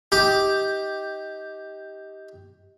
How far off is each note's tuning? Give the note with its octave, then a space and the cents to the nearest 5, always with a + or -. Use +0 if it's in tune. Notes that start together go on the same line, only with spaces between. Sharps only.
D#4 +20 G4 +0